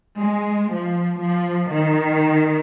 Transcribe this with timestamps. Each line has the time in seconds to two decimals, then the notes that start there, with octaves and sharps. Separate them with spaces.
0.20 G#3
0.71 F3
1.21 F3
1.70 D#3